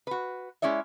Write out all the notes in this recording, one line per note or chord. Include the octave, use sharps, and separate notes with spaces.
F#4 B4
G#3 C#4 E4 D5 E5